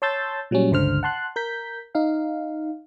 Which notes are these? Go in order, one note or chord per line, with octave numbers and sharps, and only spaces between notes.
C#5 A5 C6 E6 G6 A6
A#2 F#3 G3 C#4
G1 C#2 D3 C5 F6
F#5 A5 C6 F#6
A#4 G6 B6
D#4 F5